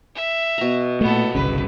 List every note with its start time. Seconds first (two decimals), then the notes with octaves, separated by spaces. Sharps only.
0.15 E5
0.58 B2 A#5
1.01 A#2 A3 B3 A4
1.35 G1 C2 C#3 B4